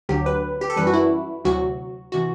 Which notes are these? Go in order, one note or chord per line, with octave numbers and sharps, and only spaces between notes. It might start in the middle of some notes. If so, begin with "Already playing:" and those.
D2 D3 F#3 G4
B4
G4
A4
F#2 E3 G3 B4
F#4
E4
D2 C3 F#3 F#4
C3 E3 F#4